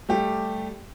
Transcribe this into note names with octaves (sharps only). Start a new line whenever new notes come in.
G3 A3 G4